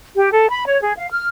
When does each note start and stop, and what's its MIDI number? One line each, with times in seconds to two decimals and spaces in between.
0.15 0.32 67
0.32 0.49 69
0.49 0.66 83
0.66 0.80 73
0.81 0.93 68
0.97 1.07 77
1.11 1.28 89